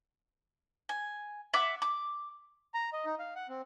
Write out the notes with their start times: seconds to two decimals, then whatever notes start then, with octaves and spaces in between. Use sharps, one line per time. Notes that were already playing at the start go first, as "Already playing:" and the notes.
0.89 G#5
1.54 E5 F#5 D6
1.82 D6
2.74 A#5
2.93 D#5
3.05 D#4
3.19 F5
3.35 F#5
3.49 C4